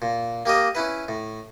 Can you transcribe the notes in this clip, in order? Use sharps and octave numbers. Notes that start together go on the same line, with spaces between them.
A#2
A#3 G4 A#4 D#5
C#4 E4 B4
A2